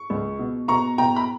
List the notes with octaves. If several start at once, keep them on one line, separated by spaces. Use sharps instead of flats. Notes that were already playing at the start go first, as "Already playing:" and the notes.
Already playing: C#6
C#2
B2
B2 A#5 C#6
B2 G5 A#5
B5